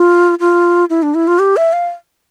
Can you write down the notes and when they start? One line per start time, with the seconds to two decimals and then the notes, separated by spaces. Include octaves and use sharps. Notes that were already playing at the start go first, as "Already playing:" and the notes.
Already playing: F4
0.40 F4
0.90 E4
1.03 D4
1.15 E4
1.27 F4
1.39 G4
1.57 E5
1.73 F5